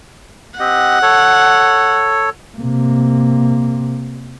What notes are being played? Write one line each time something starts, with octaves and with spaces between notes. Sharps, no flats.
C4 G4 D#5 F#5
A4 C#5
C3 A#3